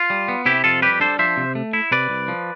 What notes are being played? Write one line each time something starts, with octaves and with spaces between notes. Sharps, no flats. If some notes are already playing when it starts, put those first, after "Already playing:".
Already playing: F4
G3
B3
C3 E4 G4
F2 F4 A4
G3 G4 B4
D4 A4 C5
F3 C5 E5
C3
A3
E4
C3 B4 D5
C2
F3